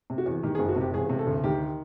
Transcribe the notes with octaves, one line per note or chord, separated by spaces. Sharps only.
C3
F#4
E2
D#3 G4
G#4
F#1
F#4
C3
G4
E1 G#4
C3
A4
D2
D#3 G4